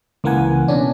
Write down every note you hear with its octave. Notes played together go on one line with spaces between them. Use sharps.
C#2 E3 A#3 A#4 F#5 G#5
B2 C#4 D4